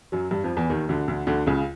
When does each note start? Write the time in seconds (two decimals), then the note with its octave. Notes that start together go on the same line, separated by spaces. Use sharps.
0.12 F#2 F#3
0.31 G2 G3
0.44 F2 F3
0.57 E2 E3
0.70 D#2 D#3
0.89 D2 D3
1.08 D2 D3
1.27 D2 D3
1.46 C#2 C#3